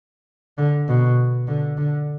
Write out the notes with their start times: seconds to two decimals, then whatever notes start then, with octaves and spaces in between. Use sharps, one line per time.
0.58 D3
0.88 B2
1.48 D3
1.77 D3